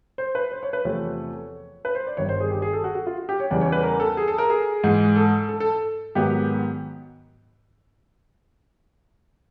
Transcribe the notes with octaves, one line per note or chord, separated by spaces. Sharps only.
C5
B4
C5
C#5
B4
E2 C3 F3 A3 C4 C#5
B4
C5
D5
G1 G2 D#3 C#5
C5
G#4
G4
G#4
A4
F#4
F#4
F4
G4
C#5
E2 C#3 E3 G3 D5
C#5
B4
A#4
A4
G#4
A4
A#4
G#4
G#2 E3 G#3
A4
A4
A4
G#2 D#3 F#3 B3 G4